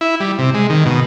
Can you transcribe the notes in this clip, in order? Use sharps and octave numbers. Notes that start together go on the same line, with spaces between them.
E4
G3
C3
G#3
D#3
B2